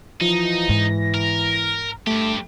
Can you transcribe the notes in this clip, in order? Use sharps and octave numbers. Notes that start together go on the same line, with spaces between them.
E3 F3 D#4
G#2 G#3 A#6
A#4
G2 A3 G4